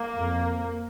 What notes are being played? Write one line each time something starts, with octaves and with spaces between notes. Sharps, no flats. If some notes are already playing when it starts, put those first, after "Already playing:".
Already playing: A#3
F2